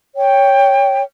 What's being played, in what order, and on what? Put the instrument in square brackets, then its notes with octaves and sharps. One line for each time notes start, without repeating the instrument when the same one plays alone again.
[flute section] C#5 G5